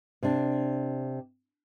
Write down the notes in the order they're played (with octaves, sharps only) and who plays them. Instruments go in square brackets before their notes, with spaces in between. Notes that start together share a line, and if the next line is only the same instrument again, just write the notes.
[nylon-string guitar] C3 D4